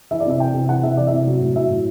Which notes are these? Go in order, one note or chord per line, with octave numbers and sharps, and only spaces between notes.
E3 E5
D5
C3 E5
E3 G5
C3
E3 F#5
C3 E5
E3 D5
E5
C3
F#3
A2
F#3 E5
A2